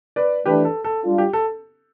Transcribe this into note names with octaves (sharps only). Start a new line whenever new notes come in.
B4 D5
E3 A3 D4 G4 B4
A4
A4
G3 D4 F4
G4
A4